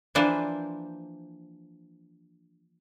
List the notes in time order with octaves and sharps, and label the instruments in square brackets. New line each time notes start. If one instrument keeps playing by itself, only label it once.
[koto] E3 F3 A#3 D4 B4 C5